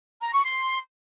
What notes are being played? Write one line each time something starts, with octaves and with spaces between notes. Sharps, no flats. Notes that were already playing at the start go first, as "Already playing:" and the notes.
A#5
C#6
C6